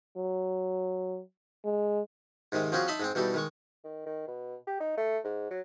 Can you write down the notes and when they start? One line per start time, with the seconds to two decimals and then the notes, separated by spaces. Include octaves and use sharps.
0.17 F#3
1.65 G#3
2.52 G#2 C3 D#3 G#3
2.72 F3 C4 C#4 F#4 G#4
2.88 D#4 D#5 E5 A5 B5 C6
3.00 G#2 G#3 C4
3.15 B2 E3 G3 D#4 A4
3.34 D#3 G#3 C#6
3.84 D#3
4.06 D#3
4.28 B2
4.67 G4
4.80 D#4
4.97 A3
5.24 G#2
5.50 F#3